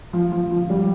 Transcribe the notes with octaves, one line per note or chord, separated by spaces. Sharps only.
F3
F3
F3
G3